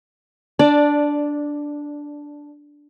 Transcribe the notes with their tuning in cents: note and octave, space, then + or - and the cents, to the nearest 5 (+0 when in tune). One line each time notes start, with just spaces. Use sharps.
D4 -5 D5 +10